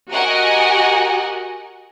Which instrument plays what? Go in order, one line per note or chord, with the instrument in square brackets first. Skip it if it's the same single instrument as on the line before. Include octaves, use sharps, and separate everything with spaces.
[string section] F#4 G4 A#4 D#5 F#5 G#5